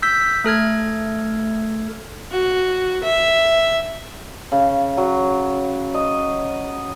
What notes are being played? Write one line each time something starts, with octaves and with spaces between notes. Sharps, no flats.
E6 G6 B6
A3 A4 F6 G#6
F#4
E5
C#3
F#3
D#5